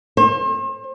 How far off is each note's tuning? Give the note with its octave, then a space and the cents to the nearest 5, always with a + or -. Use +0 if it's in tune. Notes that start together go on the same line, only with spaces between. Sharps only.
C5 +40